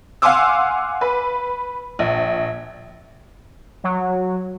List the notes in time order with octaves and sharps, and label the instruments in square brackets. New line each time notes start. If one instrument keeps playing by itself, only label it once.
[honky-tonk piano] F5 F#5 G#5 C6 D6 E6
B4
A#1
[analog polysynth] F#3